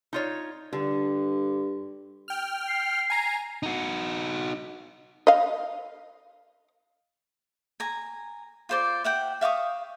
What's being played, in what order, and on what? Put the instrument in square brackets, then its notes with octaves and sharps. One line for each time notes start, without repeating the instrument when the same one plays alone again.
[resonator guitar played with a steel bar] D#4 F4 C#5
[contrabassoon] G2 [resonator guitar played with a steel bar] D3
[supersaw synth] G5 F6
[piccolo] C7
[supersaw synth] G#5 A#5
[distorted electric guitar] D#4 F#4
[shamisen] D#5 F5
[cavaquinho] G#5 A#5
F4 C5 D5
E5 F#5 G5
E5 F5 C#6 D#6